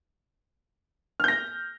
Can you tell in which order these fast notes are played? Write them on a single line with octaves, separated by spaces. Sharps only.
F6 G6 A#6